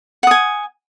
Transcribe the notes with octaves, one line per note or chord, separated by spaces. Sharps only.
F#5 G#5 D#6